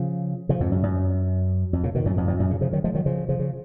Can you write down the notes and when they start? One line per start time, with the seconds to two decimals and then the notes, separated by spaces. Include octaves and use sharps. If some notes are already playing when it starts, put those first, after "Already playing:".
Already playing: C#3 F3
0.49 C#3 F3
0.60 F2 G#2
0.72 F#2
0.83 F#2
1.73 F2
1.84 A#2 C#3
1.95 B2 D#3
2.05 F#2 A#2
2.17 F2 G#2
2.27 F2 G#2
2.39 F#2 A#2
2.50 A#2 C#3
2.61 C#3 F3
2.73 D#3 F#3
2.84 F3 G#3
2.95 D#3 F#3
3.06 C#3 F3
3.29 C#3 F3
3.39 C#3